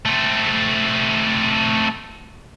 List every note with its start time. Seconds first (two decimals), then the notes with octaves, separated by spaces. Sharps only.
0.06 A3 C4